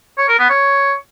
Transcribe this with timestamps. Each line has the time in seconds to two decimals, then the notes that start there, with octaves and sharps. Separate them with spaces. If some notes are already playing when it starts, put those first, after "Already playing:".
0.18 C#5
0.29 A#4
0.39 B3
0.50 C#5